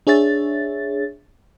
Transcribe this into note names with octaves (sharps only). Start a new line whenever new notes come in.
D4 G#4 C#5 E5 A6